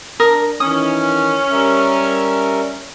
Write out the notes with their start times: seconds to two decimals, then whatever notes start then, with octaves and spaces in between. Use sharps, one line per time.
0.20 D4 A#4 D#6
0.60 D#3 E3 C#4 D#6
1.51 G3 A#4 E5